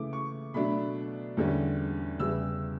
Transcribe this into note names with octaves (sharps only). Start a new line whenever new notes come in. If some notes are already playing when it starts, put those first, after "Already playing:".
Already playing: C#3 E3 A3 D6
C#6
B2 F#3 A3 D4 B5
E2 D3 G3 C#4
E2 C#3 E3 G3 E6